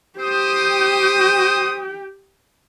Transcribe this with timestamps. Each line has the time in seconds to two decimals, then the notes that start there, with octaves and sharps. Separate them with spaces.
0.19 G4 C5 G5 D#6